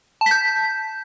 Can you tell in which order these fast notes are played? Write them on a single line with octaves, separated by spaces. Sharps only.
A5 B6 G6